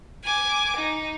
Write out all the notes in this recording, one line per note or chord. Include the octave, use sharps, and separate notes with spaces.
G#5 D6
D#4